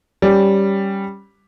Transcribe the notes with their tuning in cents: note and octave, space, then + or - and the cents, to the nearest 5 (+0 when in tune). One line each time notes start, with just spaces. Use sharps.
G3 +0 C#4 +0